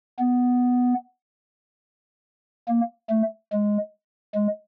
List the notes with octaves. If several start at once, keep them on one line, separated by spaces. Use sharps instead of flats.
B3
A#3
A3
G#3
G#3